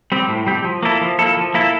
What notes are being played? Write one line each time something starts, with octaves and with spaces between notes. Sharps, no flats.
G3 C4 G4
A2
G3 C4 G4
F3
A#3 E4 A4
F3
A#3 E4 A4
F3
A#3 E4 A4